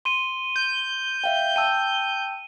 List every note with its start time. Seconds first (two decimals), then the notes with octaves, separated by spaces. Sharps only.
0.05 C6 D#7 G7
0.56 G6
1.24 E5 F5 G5
1.56 G5 A5 E6 D#7